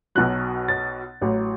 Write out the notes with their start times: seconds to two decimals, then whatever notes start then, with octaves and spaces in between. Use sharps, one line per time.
0.15 B1 B2 F#3 F#6
0.68 A6
1.21 A1 A2 F#3